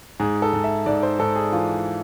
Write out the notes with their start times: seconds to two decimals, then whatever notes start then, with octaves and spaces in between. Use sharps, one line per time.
0.20 G#2 G#4
0.42 A4
0.53 G#2
0.64 E5
0.86 G#2 D5
1.03 C5
1.19 G#2 A4
1.36 G#4
1.52 E3 F4